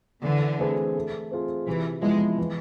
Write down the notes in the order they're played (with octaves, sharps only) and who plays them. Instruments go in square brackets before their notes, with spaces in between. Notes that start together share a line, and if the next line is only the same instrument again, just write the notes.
[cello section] D3 [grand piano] E3
[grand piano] A3 C4 G#4 B4
A3
C4 F4 G#4
[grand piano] C3 [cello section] E3
[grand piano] F3 B3 E4 [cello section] G#3
[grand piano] E3